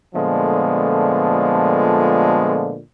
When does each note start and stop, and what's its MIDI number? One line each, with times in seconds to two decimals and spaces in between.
0.15 2.78 46
0.15 2.78 50
0.15 2.78 53
0.15 2.78 56
0.15 2.78 57
0.15 2.78 59